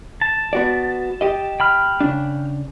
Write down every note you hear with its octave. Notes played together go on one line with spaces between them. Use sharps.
A5
B3 F#4 D5
G4 D#5
G5 B5 F6
C#3 D4